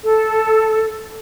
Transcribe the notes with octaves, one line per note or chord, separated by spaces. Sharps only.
A4